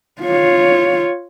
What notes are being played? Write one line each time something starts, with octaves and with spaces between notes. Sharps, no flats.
F4 C#5